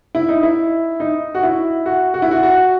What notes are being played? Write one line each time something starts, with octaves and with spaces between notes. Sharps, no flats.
E4
D#4
E4
D#4
F#4
E4
F#4
F#4
E4
F#4
F#4